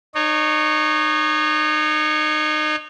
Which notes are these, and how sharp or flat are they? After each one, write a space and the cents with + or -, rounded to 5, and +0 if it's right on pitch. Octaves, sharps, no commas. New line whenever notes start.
D#4 -30 C#5 +0